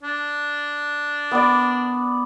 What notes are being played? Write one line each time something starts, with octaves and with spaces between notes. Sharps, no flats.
D4
B3 D5